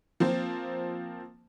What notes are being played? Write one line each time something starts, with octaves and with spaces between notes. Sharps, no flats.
F3 A#3 C4 C5